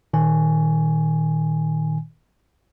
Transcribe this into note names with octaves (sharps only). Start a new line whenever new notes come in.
A#2 D#3 G#5